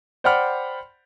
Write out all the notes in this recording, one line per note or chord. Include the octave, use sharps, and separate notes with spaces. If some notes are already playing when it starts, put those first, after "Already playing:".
C5 D5 F#5 G5 B5 F6